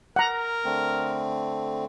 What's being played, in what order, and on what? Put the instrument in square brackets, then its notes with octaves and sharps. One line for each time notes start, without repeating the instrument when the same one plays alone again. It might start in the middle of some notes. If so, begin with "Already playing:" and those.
[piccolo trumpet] A#4 [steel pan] F#5 A#5
[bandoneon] D3 A3 C4